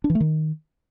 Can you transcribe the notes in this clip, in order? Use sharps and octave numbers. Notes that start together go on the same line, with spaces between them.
D4
E3
A3
D#3